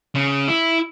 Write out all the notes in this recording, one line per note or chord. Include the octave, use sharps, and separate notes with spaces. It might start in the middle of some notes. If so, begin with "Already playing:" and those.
C#3
E4